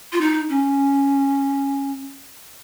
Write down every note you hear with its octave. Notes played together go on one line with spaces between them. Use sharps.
F4
D#4
C#4